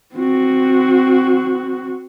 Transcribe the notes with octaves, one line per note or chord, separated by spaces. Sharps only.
C4 F#4